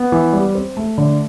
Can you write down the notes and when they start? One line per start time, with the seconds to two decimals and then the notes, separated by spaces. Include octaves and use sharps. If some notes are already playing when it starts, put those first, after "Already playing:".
Already playing: B3
0.12 E3
0.33 G3
0.55 C4
0.77 A3
0.98 D3